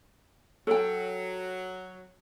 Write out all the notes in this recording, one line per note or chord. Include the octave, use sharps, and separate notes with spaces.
F#3 A4 G5